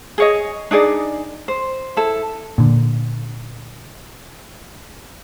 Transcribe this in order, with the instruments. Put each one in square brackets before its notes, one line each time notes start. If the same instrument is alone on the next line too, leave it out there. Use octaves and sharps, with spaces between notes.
[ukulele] G#4 C#5 D#5
D4 D#4 G#4 D5
C5
E4 A4
[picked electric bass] A#2 D3